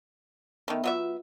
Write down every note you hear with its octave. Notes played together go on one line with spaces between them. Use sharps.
D#3 A3 B3 E5
F#3 B3 F4 E5